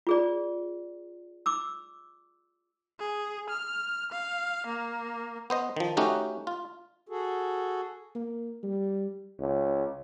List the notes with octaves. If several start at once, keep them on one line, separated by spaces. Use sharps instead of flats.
F4 G#4 D5
D6 E6
G#4
F6
F5
A#3
B3 C5 D#5
D#3 F3
A3 C#4 D#4 F#4 G4
F4
F#4 G#4 A4
A#3
G3
C#2